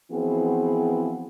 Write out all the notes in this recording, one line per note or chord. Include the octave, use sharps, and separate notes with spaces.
E3 F3 B3 C4 F#4 G#4